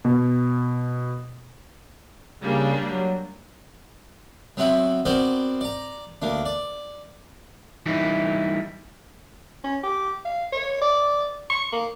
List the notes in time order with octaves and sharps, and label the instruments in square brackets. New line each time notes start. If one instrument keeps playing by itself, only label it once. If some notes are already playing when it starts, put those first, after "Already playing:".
[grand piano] B2
[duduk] C#3 [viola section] G3 A#3 D4
[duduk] F#3
[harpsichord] F#3 B3 C4 E4 F#4
B3 C4 F#4 A#4 C5 D5
D5 A#5
D2 A#3 D4
D5
[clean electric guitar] E3 G3 D#4 E4
[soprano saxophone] C#4
G4
F5
C#5
D5
C#6
A#3